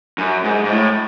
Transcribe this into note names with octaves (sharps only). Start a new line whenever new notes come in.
F#2
G#2
G#2
A2